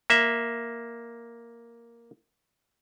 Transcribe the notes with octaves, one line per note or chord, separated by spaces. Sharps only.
A#3 E5